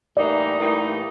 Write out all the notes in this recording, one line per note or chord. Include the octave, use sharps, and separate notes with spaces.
A2 E3 G3 A#3 D#4 D5
A2 E3 G3 A#3 D#4